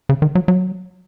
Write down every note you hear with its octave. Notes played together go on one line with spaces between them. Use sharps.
C#3
D#3
F#3
F#3